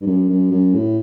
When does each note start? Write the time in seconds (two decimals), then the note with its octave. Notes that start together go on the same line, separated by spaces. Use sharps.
0.01 G2
0.07 F#2
0.29 F#2
0.51 F#2
0.74 A2